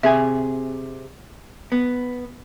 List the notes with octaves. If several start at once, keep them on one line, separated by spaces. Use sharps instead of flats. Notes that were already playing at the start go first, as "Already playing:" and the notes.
C3 G#4 E5 G#5
B3